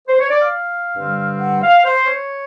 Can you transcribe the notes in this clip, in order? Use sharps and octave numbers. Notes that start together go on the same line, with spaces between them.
C5
C#5
D5
F5
G2 D3 G3 C4
F#5
F5
C5
C#5